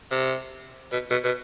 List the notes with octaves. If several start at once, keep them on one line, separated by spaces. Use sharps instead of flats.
C3
B2
B2
B2